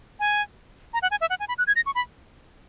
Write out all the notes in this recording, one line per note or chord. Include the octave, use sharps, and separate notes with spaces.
G#5
A#5
F#5
G#5
E5
F#5
G#5
B5
F#6
G#6
A#6
C#6
B5